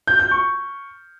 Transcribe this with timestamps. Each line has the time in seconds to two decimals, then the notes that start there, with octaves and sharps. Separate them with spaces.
0.07 G6
0.19 G6
0.31 C#6